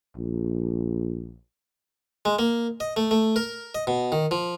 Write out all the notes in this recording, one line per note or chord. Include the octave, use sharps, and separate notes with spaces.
A#1
G#3
A#3
D#5
A3
A3
A#4
D#5
B2
D#3
F3